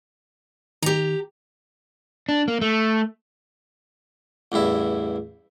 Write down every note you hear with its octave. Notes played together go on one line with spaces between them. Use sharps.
D#3 G4 A#5
D4
A#3
A3
A1 E2 G2 E4